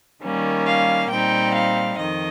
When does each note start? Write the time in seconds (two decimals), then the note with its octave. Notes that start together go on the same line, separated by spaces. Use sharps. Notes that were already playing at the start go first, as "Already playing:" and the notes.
0.23 D#3 G3 A#3 C#4
0.67 F5
1.10 A#2 G3 C4 D#4 G5
1.55 F5
1.99 F2 D#3 D#5